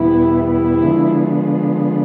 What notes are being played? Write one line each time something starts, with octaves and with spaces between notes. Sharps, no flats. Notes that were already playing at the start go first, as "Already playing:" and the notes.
Already playing: E2 B2 G3 B3 E4
E4
D3 F3 G#3 B3